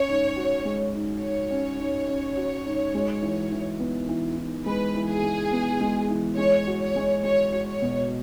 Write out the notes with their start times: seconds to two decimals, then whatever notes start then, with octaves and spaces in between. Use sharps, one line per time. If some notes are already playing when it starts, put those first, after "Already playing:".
Already playing: C#4 C#5
0.08 G#2
0.36 F#4
0.65 G#3
0.94 G#2
1.22 G#2 C#5
1.51 C#4
1.79 G#2
2.08 C#4
2.37 F#4
2.66 G#2
2.95 G#3
3.22 E3
3.52 E3
3.80 B3
4.09 E3
4.38 E3
4.66 G#3 B4
4.95 E3
5.09 G#4
5.24 G#3
5.52 B3
5.81 G#3
6.09 E3
6.37 G#3 C#5
6.67 F#4
6.82 C#5
6.96 G#3
7.24 G#3 C#5
7.53 F#4
7.68 C#5
7.82 B2